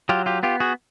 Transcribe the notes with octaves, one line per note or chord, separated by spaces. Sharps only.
F#3 F4 G4
F4 G4
B3 F4 G4
F#4 G#4